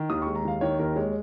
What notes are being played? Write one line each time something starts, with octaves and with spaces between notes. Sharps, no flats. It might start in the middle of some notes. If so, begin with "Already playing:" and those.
Already playing: D#3
D#2 D#6
G#3 C#6
A#5
D#2 F5
D#3 C#5
D#2 A#4
G#3 C#5